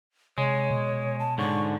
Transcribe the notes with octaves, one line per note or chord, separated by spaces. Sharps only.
C3 G#3 C#5
B2
A5
G#2 D3 C#6